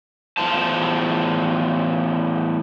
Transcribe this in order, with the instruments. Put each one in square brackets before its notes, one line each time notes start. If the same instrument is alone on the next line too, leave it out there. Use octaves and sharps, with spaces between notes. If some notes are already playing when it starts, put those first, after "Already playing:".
[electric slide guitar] E2 A2 F4 C5 A5